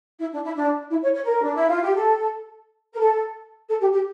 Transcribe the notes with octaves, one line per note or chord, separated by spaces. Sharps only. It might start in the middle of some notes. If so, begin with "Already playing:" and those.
E4
D4
E4
D4
E4
C#5
C#5
A#4
D4
E4
F4
G4
A4
A#4
A4
A4
G4
G4